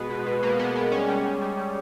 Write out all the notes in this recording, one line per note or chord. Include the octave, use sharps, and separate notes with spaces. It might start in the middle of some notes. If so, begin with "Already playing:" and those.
Already playing: B2 G#3 B3
B2
B2
B2 A#3
G#3 B3
G#3 B3
G3 C#4
G3
G3
G3
G3